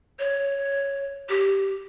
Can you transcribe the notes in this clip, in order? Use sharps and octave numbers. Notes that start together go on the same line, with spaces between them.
C#5
G4